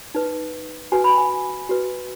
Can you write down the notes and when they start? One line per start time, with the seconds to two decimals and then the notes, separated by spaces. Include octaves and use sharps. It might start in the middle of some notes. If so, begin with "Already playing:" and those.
0.15 D#4 B4
0.92 F#4 B4 G#5
1.04 B5
1.18 G#5
1.69 F#4 B4